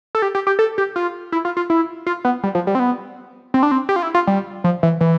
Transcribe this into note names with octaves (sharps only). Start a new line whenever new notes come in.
A4
G4
G4
G4
A4
G4
F4
E4
F4
F4
E4
F4
B3
G3
F3
G3
C4
B3
C4
D4
C4
G4
F4
E4
F4
G3
F3
E3
E3